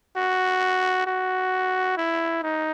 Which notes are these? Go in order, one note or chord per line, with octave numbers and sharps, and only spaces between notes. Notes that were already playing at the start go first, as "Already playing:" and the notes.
F#4
F#4
E4
D#4